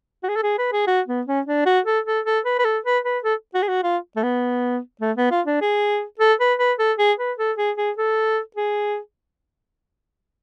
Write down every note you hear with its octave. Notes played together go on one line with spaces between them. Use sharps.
F#4
G#4
A4
G#4
B4
G#4
F#4
B3
C#4
D4
F#4
A4
A4
A4
B4
B4
A4
B4
B4
A4
F#4
G#4
F#4
F4
A3
B3
A3
B3
F4
D4
G#4
A4
B4
B4
A4
G#4
B4
A4
G#4
G#4
A4
G#4